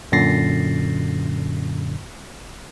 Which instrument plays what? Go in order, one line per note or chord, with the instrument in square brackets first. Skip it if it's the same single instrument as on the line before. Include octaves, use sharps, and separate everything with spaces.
[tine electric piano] F#2 A#2 D3 A6 A#6 C7